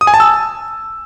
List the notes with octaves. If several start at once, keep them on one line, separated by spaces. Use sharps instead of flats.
D#6
G#5
A5
E6